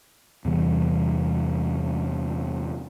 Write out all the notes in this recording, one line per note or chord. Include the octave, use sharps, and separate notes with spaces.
E2 C3 E3 G3